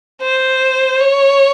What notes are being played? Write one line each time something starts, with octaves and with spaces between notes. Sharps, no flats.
C5
C#5